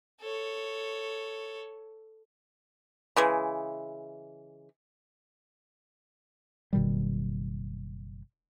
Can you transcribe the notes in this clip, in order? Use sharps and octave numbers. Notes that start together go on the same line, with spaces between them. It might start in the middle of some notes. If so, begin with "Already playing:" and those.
A4 C#5
C#3 E3 G#3
F#1 B2 D#3 G3